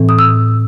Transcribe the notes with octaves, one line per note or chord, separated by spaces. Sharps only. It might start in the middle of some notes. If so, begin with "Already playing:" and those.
Already playing: A2 E3 C4
D#6
E6